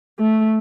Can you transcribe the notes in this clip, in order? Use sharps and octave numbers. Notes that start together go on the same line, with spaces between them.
A3